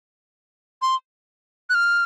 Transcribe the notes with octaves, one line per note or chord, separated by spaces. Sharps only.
C6
F#6
F6